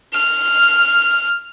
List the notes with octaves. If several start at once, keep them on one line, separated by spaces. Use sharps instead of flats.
F6